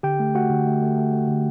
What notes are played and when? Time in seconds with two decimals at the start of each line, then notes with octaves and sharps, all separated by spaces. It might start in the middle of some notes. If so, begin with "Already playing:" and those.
0.03 D3 G4 G5
0.20 A3
0.35 A3 F#4 F#5
0.50 D3
0.67 A3
0.82 A3
0.98 A3
1.13 A3
1.28 D3